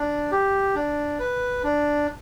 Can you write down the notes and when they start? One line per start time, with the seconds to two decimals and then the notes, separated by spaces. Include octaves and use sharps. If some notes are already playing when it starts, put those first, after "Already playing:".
Already playing: D4
0.32 G4
0.75 D4
1.19 B4
1.63 D4